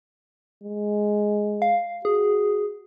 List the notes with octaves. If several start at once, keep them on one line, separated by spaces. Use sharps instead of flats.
G#3
F5
F#4 G#4